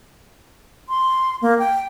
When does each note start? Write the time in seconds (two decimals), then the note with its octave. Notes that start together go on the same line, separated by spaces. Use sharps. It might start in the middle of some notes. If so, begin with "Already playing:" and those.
0.89 C6
1.42 A#3
1.59 G5